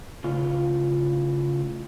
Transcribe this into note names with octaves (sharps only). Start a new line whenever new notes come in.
A2 C#3 F4